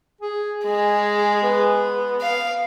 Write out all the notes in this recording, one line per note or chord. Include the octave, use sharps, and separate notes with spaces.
G#4
G#3 G#4
B3
F5